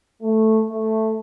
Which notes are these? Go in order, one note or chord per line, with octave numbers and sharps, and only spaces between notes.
A3
A3